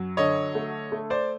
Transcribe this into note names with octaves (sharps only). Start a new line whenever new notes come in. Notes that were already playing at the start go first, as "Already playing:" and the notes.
Already playing: F#2 F#3
D3 C#5 D#5
A3
A3
C5 D5